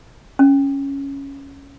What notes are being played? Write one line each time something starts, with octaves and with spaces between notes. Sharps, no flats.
C#4